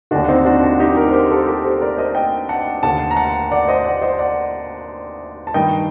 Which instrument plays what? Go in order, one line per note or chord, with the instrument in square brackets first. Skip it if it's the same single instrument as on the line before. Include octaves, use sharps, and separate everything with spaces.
[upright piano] D#2 D3 D4 F#4
C4 D#4
D4 F#4
D4 F#4
D#4 G4
G4 A#4
C5
G4 A#4
A4 C5
G4 A#4
A4 C5
A#4 D5
C5 D#5
D#5 G5
F#5 A5
D#2 D3 F#5 A5
A#5
F#5 A5
D5 F#5
C5 D#5
D5 F#5
C5 D#5
D5 F#5
A5
G2 D#3 D#5 G5